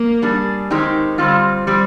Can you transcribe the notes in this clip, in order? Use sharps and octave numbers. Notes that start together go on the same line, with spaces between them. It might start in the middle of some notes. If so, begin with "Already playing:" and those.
Already playing: A#3
G3 D4 G#4
D#3 G#3 C4 D#4 G4
D3 G3 C4 F4
G3 C4